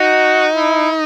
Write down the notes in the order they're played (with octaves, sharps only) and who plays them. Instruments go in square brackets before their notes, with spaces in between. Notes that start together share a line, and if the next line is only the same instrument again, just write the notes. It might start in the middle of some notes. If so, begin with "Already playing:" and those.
Already playing: [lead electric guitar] D#4 [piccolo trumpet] F#4
[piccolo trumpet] E4